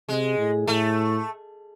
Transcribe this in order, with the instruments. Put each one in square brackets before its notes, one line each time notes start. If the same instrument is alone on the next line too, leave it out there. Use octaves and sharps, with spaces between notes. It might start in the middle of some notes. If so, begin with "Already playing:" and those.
[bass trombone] C3 [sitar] G#3
[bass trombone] A2
[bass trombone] A2 [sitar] A3